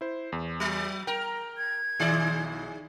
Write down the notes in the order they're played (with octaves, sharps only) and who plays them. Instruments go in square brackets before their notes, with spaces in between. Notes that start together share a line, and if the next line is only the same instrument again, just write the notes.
[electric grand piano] E4 C5
E2
[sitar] F#3
[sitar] A#4 [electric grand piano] G5
[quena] G#6
[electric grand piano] B1 E4 [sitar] D#3 G#4 D5